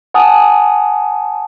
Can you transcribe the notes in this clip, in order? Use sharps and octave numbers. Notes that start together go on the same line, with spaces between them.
F#5 G#5 A5 D#6